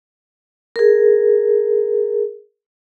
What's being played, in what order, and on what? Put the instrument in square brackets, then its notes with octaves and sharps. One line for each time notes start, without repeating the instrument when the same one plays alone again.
[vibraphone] G#4 A#4